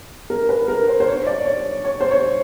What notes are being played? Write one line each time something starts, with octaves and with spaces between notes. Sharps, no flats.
A#4
B4
A#4
C5
C5
C#5
D5
C#5
C#5
C5
C#5